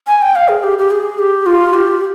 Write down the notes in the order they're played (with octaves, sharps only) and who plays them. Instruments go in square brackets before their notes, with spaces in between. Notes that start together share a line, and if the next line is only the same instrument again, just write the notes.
[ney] G#5
G5
F5
G#4
G4
G4
G#4
G4
F4
G4